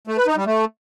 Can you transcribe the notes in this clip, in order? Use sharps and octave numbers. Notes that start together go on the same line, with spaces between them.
A3
B4
D#4
G3
A3